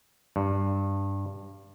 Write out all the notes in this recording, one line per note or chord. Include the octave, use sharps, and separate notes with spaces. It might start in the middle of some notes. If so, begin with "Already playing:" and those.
G2